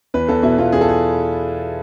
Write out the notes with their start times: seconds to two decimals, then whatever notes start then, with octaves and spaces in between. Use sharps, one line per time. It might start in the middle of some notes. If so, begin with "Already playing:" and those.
0.14 E2 B4
0.29 E2 A4
0.43 B2 E4
0.58 B2 F4
0.72 E2 G#4
0.81 A4
0.89 G#4